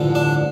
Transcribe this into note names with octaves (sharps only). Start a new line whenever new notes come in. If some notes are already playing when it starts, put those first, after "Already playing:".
Already playing: A1 G2 D3 F3
D4